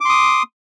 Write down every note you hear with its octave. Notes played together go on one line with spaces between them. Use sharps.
C6 D6 D#6